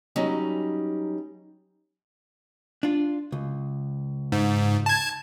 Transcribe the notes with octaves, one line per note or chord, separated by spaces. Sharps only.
F#3 G3 C#4 D#4
D4 F4
C#2
G#2
A5 G#6